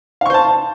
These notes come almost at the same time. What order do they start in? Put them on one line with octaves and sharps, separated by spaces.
F5 C#6 C5 A5